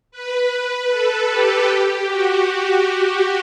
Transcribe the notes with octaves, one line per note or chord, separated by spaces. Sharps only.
B4
A4
G4
G4
F#4
F#4